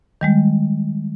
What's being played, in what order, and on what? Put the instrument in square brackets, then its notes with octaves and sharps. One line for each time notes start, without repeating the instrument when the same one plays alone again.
[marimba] D#3 G3 G#3